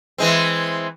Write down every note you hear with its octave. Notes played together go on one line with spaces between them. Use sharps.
E3 G#3 C4